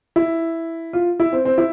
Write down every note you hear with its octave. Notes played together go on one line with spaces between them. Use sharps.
E4
F4
E4
C4
C4
E4